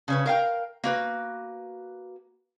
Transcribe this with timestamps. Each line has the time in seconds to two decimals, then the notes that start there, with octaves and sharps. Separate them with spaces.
0.08 C#3 C#4 B4
0.26 A#4 F5 G5
0.84 A#3 F#4 B4